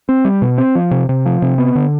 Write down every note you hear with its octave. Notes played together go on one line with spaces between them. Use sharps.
C4
G3
B2
C4
F3
C3
C3
F3
C3
B3
D3